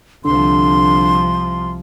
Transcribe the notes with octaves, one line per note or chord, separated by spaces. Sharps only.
C2 D3 F3 C6